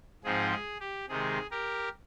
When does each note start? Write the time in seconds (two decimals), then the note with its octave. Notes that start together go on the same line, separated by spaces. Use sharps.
0.24 G#2 F3 C4 D#4 G#4
0.52 G#4
0.80 G4
1.09 C3 D#3 G#3 D#4 G#4
1.51 G4 A#4